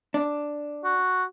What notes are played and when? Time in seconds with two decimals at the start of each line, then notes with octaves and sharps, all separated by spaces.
0.14 D4
0.84 F#4